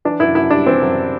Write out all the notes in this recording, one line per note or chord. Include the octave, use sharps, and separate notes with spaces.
E3 D4
F#2 E4
F#2 E4
G3 D4
E3 C4
F#2